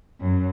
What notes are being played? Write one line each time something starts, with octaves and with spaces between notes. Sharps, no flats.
F#2